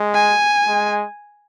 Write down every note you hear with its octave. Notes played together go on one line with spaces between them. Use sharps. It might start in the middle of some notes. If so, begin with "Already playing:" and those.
Already playing: G#3
G#5
G#3